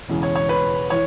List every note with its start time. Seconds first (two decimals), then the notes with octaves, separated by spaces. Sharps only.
0.08 E1 E2 C#3 E3 G#3
0.23 C#5
0.35 C#5
0.49 B4
0.90 E3 C#5